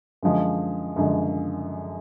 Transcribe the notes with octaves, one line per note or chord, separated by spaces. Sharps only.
F#2 D3 F3 G#3
F#2 D3 F3 G#3